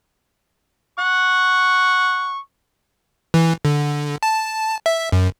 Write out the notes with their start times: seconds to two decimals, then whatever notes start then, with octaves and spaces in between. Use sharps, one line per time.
0.99 F#5 C#6
3.34 E3
3.65 D3
4.23 A5
4.86 E5
5.12 F#2